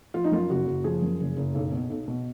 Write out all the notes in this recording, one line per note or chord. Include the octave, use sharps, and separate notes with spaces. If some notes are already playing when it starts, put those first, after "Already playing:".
F3 F4
D#4
F#2 F4
F#1 F#4
F#1
F3 G#4
F#2
F#1
F#1
B1
B2
B1
B2